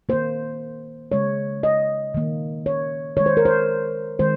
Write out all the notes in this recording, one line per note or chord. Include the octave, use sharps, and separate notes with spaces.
D#3 A#3 C5
C#3 G#3 C#5
D#5
D#3 A#3
C#5
D#3 G#3 C#5
C5
A#4
C5
D#3 G#3 C5